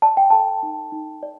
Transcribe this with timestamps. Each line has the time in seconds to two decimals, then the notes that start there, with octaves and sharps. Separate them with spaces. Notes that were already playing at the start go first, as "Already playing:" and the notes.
0.02 D5 A5
0.17 G5
0.30 A4 A5
0.63 D#4
0.92 D#4
1.23 D5